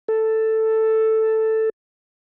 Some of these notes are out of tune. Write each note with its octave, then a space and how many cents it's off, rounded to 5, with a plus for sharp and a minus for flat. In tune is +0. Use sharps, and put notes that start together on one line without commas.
A4 +5